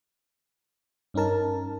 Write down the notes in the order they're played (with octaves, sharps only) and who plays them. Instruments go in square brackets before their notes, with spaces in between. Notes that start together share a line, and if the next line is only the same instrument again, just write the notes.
[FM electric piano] G2 C#4 D#4 A#4 A5